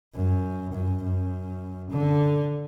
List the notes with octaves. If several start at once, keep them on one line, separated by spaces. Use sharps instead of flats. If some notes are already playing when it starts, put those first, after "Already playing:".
F#2
F#2
F#2
D3